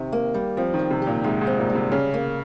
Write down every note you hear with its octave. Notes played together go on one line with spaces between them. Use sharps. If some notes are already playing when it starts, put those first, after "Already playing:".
Already playing: C3 D#3
A#3
G3
F3 C4
D#3
G3
C3
G4
A#2
G#2 C3
G#2
C4
A#2
G3
C3
C#3 C#4
A#3